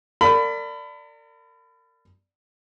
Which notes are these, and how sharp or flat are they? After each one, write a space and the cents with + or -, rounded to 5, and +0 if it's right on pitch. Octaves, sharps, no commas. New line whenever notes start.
A#4 -35 D5 +0 B5 +25